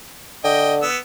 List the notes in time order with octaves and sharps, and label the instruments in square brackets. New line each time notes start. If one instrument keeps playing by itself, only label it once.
[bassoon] D3 [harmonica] D#5 G5
[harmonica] B3 E6